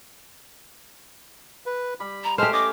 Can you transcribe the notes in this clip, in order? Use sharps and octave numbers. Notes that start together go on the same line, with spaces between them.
B4
G3 B5
A#5
G#3 A3 G4 C5 A5 F6
C#4 D#5 D6